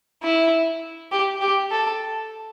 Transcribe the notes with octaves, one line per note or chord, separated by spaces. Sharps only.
E4
G4
G4
A4